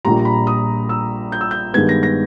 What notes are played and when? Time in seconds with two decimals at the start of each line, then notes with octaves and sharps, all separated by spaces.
0.05 A#1 A#2 G3 A#5
0.25 B5
0.47 D#6
0.89 E6
1.32 G6
1.41 E6
1.51 G6
1.74 G2 D#3 G#3 B3 G#6
1.89 A#6
2.03 A#6